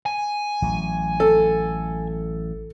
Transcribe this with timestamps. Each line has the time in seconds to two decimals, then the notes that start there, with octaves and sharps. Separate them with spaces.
0.06 G#5
0.62 A1 F#3
1.20 A4